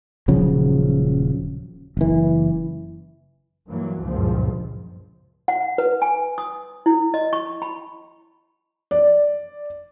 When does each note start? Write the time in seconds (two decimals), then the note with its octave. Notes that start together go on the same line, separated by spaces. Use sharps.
0.28 D#1 C#3 F3 F#3
1.97 F#1 E3
3.69 G2 E3 F#3 A#3
4.05 F#1 C#2 G2 A#2 F3
5.48 F#5
5.78 B4
6.02 G#5
6.38 D#6
6.86 E4
7.14 D#5
7.33 C#6
7.62 B5
8.91 D5